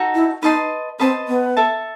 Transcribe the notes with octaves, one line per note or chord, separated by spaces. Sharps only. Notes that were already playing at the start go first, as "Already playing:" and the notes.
Already playing: D#4 F#4 A4
E4
D#4 B4 D#5 A5 C6
C4 B4 D#5 A5 C6
B3
A4 E5 A5